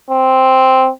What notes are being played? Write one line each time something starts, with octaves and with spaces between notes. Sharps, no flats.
C4